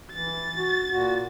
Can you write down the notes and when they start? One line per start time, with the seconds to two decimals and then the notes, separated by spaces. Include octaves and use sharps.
0.13 E3 A6
0.55 F#4
0.91 A#2 F#4